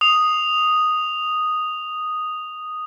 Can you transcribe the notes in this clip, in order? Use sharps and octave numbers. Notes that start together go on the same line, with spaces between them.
D#6 F7